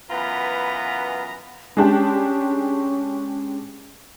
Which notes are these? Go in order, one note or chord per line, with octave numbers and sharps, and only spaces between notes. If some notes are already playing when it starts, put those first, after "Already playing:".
F#2 E3 B3 F4 B4 A#5
G#3 C#4 D4 G4